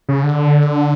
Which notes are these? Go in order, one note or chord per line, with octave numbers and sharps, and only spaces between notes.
C#3
D3